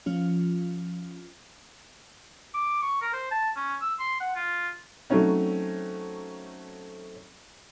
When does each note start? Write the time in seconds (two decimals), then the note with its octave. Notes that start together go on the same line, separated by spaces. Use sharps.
0.06 F3 C#4 F4
2.54 D6
2.82 C#6
3.02 A#4
3.13 C5
3.31 A5
3.56 C#4
3.82 E6
3.99 C6
4.20 F#5
4.35 F4
5.10 F#3 A3 C4 C#4 D#4